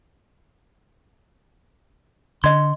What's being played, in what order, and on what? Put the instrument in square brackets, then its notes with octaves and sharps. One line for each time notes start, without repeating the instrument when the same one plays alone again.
[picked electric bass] D3 [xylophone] D#5 G#6 [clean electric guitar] C6